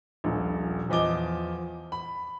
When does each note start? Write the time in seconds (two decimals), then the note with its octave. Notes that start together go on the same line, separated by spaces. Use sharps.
0.24 D#1 A#1
0.90 E2 F3 D#5 D6 G7
1.92 B5